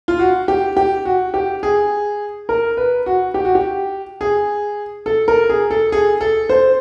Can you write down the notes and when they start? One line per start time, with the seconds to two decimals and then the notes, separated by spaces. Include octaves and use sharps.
0.08 F4
0.19 F#4
0.48 G4
0.77 G4
1.05 F#4
1.34 G4
1.63 G#4
2.49 A#4
2.77 B4
3.06 F#4
3.34 G4
3.45 F#4
3.55 G4
4.21 G#4
5.06 A4
5.28 A#4
5.50 G#4
5.71 A4
5.92 G#4
6.21 A4
6.49 C5